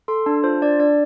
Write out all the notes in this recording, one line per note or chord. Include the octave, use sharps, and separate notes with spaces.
A4 C6
D4 A5
F4 C5
D4 D5
D4 D5